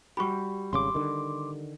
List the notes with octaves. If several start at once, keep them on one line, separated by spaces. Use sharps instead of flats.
G3 F#4 G4 B5 C#6
G#1 C#3 C6 D6
D3 D#3